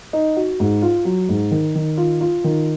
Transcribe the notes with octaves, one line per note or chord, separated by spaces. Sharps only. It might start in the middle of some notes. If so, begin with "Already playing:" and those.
D#4
F#4
G#2
F4
F#3
G#2
D#3
D#3
F4
F4
D#3